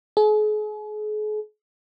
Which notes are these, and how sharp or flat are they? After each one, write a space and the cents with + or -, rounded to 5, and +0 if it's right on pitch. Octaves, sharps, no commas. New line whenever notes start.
G#4 +40